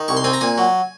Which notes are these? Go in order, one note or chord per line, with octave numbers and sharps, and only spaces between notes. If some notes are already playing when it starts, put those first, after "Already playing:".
Already playing: D#3
C2 C#6
C6
C4 G#5
A#5
A#2 G#5
F#3